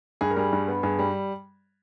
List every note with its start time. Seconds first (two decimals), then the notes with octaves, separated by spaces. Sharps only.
0.21 G2 G#4
0.31 A#4
0.37 G3 G#4
0.53 G2
0.68 B3
0.83 G2 G#4
0.99 G3